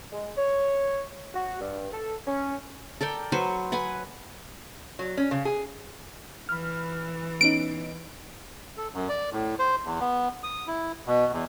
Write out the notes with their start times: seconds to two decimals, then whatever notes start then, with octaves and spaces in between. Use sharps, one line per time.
0.12 G#3
0.37 C#5
1.35 F#4
1.60 G2
1.92 A4
2.27 C#4
3.01 A4 A#4 D5 G5
3.32 F#3 B4 C5 C#6
3.72 B4 F#5 G#5 B5
4.99 F#3
5.17 C#4
5.31 C#3
5.45 G#4
6.49 E3 B5 F6
7.41 B3 C#4 D#4 D7
8.77 A4
8.94 F#2
9.09 D5
9.32 A2
9.59 C5
9.85 E2
10.00 B3
10.43 D#6
10.68 E4
11.06 B2
11.33 E2